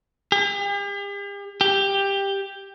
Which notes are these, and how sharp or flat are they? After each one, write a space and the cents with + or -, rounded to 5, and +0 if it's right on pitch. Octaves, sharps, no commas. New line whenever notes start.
G4 +45
G4 +10